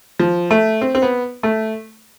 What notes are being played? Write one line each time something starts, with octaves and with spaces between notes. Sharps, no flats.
F3
A3
C4
C4
B3
A3